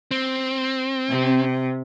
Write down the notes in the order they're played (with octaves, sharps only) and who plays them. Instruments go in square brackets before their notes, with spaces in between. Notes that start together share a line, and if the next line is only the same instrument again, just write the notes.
[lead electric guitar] C4
[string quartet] C3